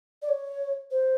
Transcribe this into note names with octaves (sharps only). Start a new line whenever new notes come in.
D5
C#5
C5